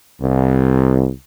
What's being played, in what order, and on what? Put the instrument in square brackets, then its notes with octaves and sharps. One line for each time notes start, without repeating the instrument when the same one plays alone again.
[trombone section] C2